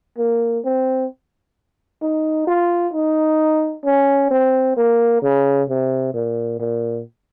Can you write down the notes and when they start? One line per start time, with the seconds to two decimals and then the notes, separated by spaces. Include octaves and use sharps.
0.18 A#3
0.65 C4
2.02 D#4
2.47 F4
2.93 D#4
3.85 C#4
4.31 C4
4.77 A#3
5.22 C#3
5.69 C3
6.14 A#2
6.60 A#2